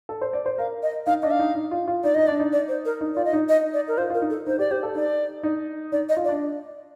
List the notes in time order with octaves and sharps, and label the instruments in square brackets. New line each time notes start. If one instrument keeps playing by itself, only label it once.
[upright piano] A4
C5
D5
C5
[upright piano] A#4 [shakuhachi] F5
[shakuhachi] D#5
[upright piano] D#4 [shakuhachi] F5
[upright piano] D4 [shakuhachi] D#5
[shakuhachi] F5
[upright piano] D#4
D#4
F4
F4
[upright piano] D#4 [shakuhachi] D5
[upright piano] D#4 [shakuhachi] D#5
[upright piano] D4 [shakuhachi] D5
[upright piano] D#4
[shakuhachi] D5
C5
A#4
[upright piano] D#4
[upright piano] F4 [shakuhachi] D5
[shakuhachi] D#5
[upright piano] D#4
[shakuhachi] D#5
D5
A#4
[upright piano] F4 [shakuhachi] C5
[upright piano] F4 [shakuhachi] A#4
[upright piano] D#4
[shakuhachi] A4
[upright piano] D#4 [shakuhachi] C5
[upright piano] G4 [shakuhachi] D5
[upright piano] G4 [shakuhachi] C5
[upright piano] A4
[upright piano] D#4 [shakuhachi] D5
[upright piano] D#4
[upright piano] D#4 [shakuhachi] D5
[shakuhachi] D#5
[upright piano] F4
[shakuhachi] D5
[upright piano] D4